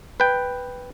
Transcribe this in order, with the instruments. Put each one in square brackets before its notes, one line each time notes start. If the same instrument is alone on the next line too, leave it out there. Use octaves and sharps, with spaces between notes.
[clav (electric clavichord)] B4 G5